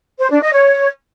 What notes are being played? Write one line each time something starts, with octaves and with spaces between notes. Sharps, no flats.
C5
D4
D#5
C#5